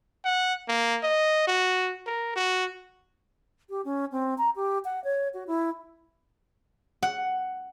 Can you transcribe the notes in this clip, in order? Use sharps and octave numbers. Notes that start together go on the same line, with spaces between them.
F#5
A#3
D#5
F#4
A#4
F#4
G4
C#4
C4
A#5
G4
F#5
C#5
F#4
E4
F#5